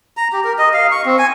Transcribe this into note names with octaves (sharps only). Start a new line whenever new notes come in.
A#5
G4
A#4
D#5
F5
C#6
C4
G#5